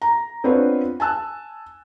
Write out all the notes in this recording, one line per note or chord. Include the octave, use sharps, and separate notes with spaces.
A#5
B3 C4 D4 F4 B4 C#5
G#5 A5 E6 F#6